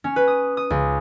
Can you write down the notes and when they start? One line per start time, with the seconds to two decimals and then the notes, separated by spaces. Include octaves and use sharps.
0.04 C#4
0.16 B4
0.28 D#6
0.57 D#6
0.70 C#2